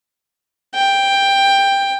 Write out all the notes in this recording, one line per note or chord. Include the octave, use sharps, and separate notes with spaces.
G5